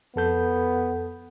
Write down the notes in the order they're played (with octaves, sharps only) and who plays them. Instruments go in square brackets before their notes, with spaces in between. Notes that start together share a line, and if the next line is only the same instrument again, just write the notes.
[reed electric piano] F2 A4 G6 [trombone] B3